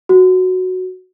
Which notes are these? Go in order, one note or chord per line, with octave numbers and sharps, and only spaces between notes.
F#4